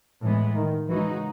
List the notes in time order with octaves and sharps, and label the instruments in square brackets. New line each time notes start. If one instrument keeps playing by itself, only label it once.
[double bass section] A2 [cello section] E3 G#3 B3
[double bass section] D#3
[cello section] C#3 G#3 D#4 F#4 [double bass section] E3